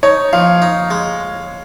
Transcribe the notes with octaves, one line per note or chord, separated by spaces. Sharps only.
D#4 C#5
F3 F5
D#4
G#3